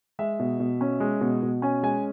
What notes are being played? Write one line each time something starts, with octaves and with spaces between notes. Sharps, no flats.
G#3 E5
B2
B2
C#4
G#3
B2
B2
C#4 G#5
G#3 G#5